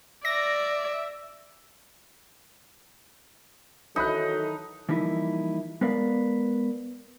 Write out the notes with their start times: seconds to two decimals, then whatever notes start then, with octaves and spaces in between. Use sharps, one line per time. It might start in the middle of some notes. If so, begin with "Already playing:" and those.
0.25 D5 E5 A#6
3.96 D#3 E3 F#3 D#4 A4 E5 B5 F#6
4.89 E3 F3 G3 A#3 D#4 E4
5.81 G#3 B3 A#4 B4 D5 F5